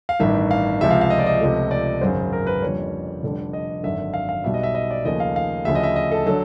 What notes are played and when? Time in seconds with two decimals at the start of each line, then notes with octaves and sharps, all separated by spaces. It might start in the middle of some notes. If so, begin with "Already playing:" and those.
0.09 F5
0.19 A1 G2 D#3 E5
0.51 F5
0.81 C#2 C3 F3 G#3 E5
0.90 F5
1.01 F5
1.10 D#5
1.19 D5
1.26 D#5
1.41 C#2 C3 F3 A3
1.71 D5
2.01 G#1 F#2 C#3 C5
2.33 A#4
2.47 B4
2.62 F#1 F2 D3 G3 C#5
3.23 F1 F2 D3 G3
3.53 D#5
3.83 G#1 F#2 D3 E5
4.14 F5
4.29 F5
4.44 B1 B2 G3 E5
4.54 D#5
4.63 E5
4.75 D#5
4.91 D5
5.05 D#2 C#3 F3 A3 D#5
5.20 F5
5.36 F5
5.65 D2 C#3 F3 E5
5.75 D#5
5.83 E5
5.96 D#5
6.12 A4
6.26 D3 F#3 A4